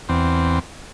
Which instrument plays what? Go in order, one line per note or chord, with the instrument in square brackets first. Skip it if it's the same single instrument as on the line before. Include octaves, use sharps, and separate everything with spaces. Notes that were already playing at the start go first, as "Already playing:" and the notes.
[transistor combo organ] E2 C4